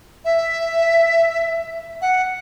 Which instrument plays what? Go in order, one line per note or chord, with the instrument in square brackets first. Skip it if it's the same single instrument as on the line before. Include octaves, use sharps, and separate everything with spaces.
[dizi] E5
F#5